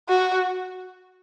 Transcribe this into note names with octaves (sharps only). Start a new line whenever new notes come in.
F#4